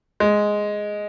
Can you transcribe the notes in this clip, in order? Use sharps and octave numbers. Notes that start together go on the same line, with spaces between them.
G#3